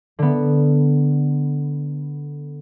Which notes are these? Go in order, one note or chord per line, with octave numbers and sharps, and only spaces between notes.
D3 B3